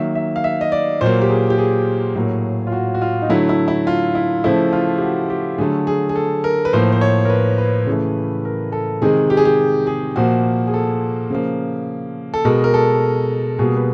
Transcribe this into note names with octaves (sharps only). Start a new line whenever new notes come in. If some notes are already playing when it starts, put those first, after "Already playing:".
Already playing: D#3 F#3 A#3 E5
E5
F5
E5
D#5
D5
A#2 F#3 A#3 C5
G4
G#4
G4
G#4
A2 F#3 A#3
F4
F#4
F#4
F4
D#4
D3 F#3 A3 E4
E4
E4
F4
E4
C#3 F3 A3 E4
F4
G4
F#4
G4
D3 F#3 A3 G#4
G#4
G#4
A4
A#4
B4
A2 F3 A#3 C5
C5
C#5
A#4
B4
B4
C#3 E3 A3
A#4
A4
C3 D#3 G#3 G#4
G4
G#4
G4
G#4
A#2 F3 A#3 F#4
G#4
A4
C#3 F3 A#3
A4
B2 G#3 A#4
A#4
A4
B2 G3 A#3 G#4
B4